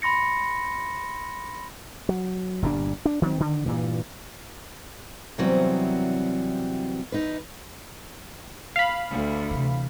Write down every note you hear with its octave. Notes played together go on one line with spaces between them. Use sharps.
B5 C6 A#6 C#7
F#3
G1 A#2 G3 D4
D4
D#3 F#3 G3 C4
D3 D#3
G2 A#2 E3
C3 E3 F#3 G3 B3 C4
E2 D#4 B4
F5 B5
D2
C3 E3